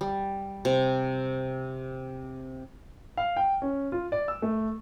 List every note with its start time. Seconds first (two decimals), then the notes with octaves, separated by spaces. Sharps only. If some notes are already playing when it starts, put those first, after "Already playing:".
0.01 G3
0.65 C3
3.17 F5
3.37 G5
3.62 C#4
3.92 F4
4.12 D5
4.28 E6
4.42 A3